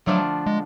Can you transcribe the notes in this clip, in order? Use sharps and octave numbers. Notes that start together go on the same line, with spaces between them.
D3 F3 F#3 A3 D4 F4
G#3